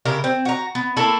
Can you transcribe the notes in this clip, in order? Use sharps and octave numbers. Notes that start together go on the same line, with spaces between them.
C#3 E4 G4 A#4
C4
F#4 A#5
B3
A3 A#3 E4 A4